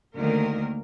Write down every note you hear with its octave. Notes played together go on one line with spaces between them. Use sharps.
D2 D#3 A#3 A#4